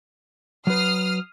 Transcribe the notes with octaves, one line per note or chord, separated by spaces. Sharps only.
F#3 B4 D#6 F6 C7